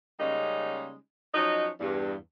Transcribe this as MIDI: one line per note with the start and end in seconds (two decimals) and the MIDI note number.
0.20 0.95 49
0.20 0.95 55
0.20 0.95 56
0.20 0.95 58
0.20 0.95 61
0.20 0.95 63
1.34 1.69 53
1.34 1.69 54
1.34 1.69 61
1.34 1.69 63
1.80 2.14 40
1.80 2.14 43